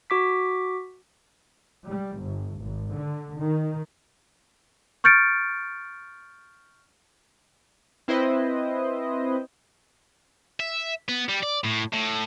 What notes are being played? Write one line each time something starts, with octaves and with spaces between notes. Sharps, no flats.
F#4 D6 B6
G3
G1
G#1
D3
D#3
C#6 F6 G6 A6 C#7 D7
C4 E4 B4 C5 D#5
E5
B3
G3
D5
A2
A2